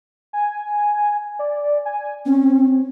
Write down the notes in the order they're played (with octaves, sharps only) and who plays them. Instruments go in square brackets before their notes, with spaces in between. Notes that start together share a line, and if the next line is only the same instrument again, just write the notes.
[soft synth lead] G#5
D5
G#5
[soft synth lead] C4 [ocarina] C#4